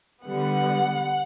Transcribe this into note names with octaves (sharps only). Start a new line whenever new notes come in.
D3 G3 B3 F#5